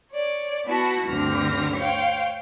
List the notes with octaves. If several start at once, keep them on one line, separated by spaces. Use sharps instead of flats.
C#5 D5
B3 E4 F#4 A5
D2 G2 D3 C4 F6 A#6
C5 C#5 F5 G5